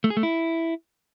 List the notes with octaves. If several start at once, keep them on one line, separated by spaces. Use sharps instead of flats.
A3
G#4
A3
E4